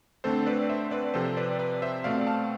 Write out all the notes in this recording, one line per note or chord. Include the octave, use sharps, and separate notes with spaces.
D3 A3 C4 A4 C5
B4 D5
C5 E5
B4 D5
C3 F3 C4 A4 C5
B4 D5
B4 D5
C5 E5
B2 A3 C4 D5 F5
F5 A5